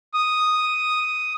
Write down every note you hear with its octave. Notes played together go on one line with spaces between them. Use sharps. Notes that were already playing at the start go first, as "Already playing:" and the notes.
D#6